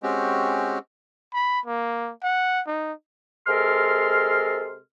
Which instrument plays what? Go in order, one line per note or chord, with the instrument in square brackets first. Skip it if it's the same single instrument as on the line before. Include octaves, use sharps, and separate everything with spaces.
[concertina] G#3 C4 C#4 F#4 G4
[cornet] B5
A#3
F#5
D#4
[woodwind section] C3 G#3 A4 A#4 C6 F6